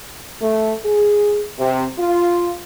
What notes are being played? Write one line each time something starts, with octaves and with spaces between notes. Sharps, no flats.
A3
G#4
C3
F4